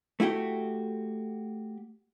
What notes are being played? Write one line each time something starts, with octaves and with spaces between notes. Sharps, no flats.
A3 E4 F#4 G4